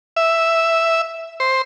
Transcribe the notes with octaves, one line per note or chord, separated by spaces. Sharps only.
E5
C5